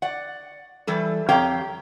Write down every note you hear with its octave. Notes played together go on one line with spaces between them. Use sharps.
D5 F#5
E3 G3 A4
F2 G4 C#5 F5 G5 A#5